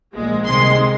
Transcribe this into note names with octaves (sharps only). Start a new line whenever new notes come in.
A#1 A#2 G#3
C2 C3 D#3 G#3 C6